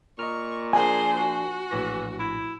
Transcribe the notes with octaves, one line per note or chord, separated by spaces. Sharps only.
A#2 D#5 A#5 C#6 F6
F3 D4 G#4 A#4 C5 G#5
F#4
A#1 A2 E3 A#6
E4